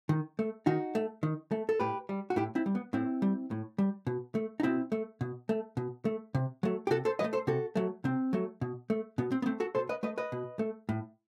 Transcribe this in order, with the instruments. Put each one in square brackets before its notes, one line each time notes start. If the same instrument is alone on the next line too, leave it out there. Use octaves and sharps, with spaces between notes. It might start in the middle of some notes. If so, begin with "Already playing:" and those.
[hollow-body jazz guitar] D#3
A3
D#3 D#4 F#4
A3
D#3
A3
A4
A2 G4 B4
G3
F#4
A2 E4 G4
C4 E4
G3
B3
A2 C4 E4
G3
A2
G3
B2
A3
D#4
B2 C4 E4
A3
B2
A3
B2
A3
C3
F#3 A3
G4
C3 F#4 A4
A4 C5
F#3 B4 D#5
A3
A4 C5
C3 F#4 A4
F#3 A3
C3 C4
F#3 A3
B2
A3
B2 B3
C4
B3
A3 C4
F#4 A4
B2 A4 C5
B4 D#5
A3 B4 D#5
B4 D#5
B2
A3
A2